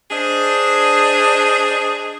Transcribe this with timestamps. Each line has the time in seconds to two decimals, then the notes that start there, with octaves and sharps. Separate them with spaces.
0.11 D4 G#4 C5 D#5